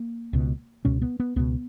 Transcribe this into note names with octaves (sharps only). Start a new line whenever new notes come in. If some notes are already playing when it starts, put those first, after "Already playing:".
Already playing: A#3
C#2 B2
C#2 B2 C#4
B3
B3
C#2 B2 B3